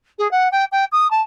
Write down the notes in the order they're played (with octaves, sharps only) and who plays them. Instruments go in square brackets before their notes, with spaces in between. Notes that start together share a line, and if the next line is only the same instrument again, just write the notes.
[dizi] G#4
F#5
G5
G5
D#6
A5